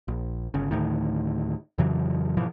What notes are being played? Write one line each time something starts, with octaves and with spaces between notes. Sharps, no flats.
A#1
G1 C#3
D2 A2 D#3
F2 C#3 E3 F#3
G#2 B2 E3 F3